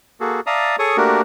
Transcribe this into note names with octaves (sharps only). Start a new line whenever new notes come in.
A#3 F#4 G#4 A4
D5 E5 F5 A5 A#5 D#6
G#4 A4 C#5 C#6 D#6
A3 A#3 D4 F#4 G4 A#4